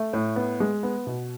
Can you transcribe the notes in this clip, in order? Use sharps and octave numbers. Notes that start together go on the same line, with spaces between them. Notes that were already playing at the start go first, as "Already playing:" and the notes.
Already playing: A3
A2
B3
G#3
B3
B2